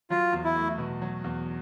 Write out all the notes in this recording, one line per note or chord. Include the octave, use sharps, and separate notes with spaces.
F#3 F4
E2
E4
A3
B2
F#3
E2